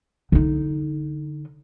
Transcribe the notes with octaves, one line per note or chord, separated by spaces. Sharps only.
D3 D#4